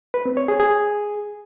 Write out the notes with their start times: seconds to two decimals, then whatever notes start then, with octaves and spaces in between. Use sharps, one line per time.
0.14 B4
0.25 C4
0.37 C#5
0.48 G#4
0.60 G#4